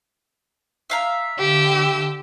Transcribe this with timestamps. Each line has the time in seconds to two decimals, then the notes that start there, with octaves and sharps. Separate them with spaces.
0.90 E5 F5 A#5
1.39 D3 G4 E6